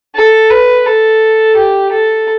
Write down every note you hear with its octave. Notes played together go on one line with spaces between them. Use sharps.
A4
B4
A4
G4
A4